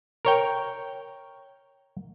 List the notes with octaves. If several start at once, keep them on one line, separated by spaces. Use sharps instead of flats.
A#4 C#5 G5